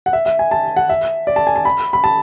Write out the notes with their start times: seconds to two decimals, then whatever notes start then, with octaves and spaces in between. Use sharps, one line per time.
0.06 F#5
0.13 E5
0.26 E5
0.39 G#5
0.51 A5
0.77 F#5
0.89 E5
1.27 D5
1.36 A5
1.47 G#5
1.56 A5
1.65 B5
1.93 B5
2.04 A5